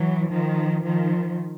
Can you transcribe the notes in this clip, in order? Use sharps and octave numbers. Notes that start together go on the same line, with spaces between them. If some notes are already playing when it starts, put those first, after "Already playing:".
Already playing: E3 F#3
D#3 F3
D#3 F3